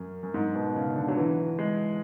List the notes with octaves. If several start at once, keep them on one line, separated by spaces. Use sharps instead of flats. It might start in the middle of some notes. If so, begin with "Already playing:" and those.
Already playing: F#2
F#2
G#2
B2
C#3
D3
F#3
E3
G#3